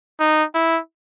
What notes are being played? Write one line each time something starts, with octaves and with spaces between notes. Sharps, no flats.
D#4
E4